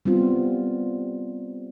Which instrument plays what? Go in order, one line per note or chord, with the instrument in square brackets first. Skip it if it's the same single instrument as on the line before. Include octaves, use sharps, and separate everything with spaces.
[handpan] G3 B3 C4 F4